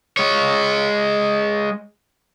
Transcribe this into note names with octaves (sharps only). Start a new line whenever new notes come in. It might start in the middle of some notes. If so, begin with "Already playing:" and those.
G#3 C#5